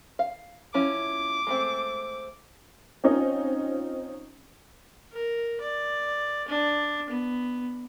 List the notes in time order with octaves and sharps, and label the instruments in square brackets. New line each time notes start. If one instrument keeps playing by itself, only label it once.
[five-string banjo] F5
[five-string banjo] F3 C#4 E4 [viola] D6
[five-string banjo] G#3 A3 C4
[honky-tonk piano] C4 C#4 D#4 F4
[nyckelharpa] A#4
D5
D4
B3